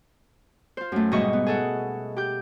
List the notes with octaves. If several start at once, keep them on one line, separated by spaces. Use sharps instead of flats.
F4 C5
F#2 A3
G#2 B2 G3 D#5 E5 C#6
B3
G#4 A4 F#5
G4 G6